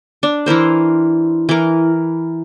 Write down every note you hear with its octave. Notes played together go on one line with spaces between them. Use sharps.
D4
E3 E4 A#4 C5
E3 A#4